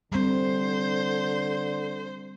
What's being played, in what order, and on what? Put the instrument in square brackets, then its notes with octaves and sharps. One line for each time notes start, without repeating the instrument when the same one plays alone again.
[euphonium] D3 [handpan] G3 C4 [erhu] C5